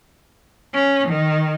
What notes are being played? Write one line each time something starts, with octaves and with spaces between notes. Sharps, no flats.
C#4
D#3